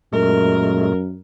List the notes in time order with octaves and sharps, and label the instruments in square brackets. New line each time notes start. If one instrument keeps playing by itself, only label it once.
[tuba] F#2 [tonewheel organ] A#2 G#3 A3 [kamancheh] A#4